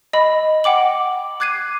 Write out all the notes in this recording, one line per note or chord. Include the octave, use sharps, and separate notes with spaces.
D#5 B5
F#5 G5 D6 F#7
D6 F#6 G#6 C7 D#7